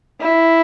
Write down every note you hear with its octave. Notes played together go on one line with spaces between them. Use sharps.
E4